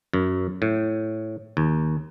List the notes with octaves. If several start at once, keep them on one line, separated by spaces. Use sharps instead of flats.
F#2
A2
D#2